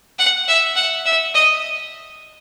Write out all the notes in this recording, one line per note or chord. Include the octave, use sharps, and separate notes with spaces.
F#5
E5
F#5
E5
D#5